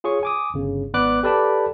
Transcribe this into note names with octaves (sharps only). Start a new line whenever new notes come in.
F4 G#4 C#5 C#6
G#5 D6 D#6
G1 C#3
G#1 B3 B4 D5 D6 F#6
G4 A4 B4 D5 A5 B5